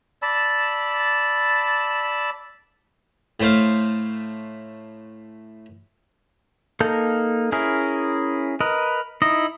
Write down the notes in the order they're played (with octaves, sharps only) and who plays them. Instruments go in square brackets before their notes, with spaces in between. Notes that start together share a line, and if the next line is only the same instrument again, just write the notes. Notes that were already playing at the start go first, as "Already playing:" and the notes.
[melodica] D5 A5 B5 E6
[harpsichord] A2 A3 C5 F5
[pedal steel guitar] A#3 D#4 A4 A5 G6
C#4 E4 G#4 A#4
A#4 B4 D#5
D#4 E4 D#5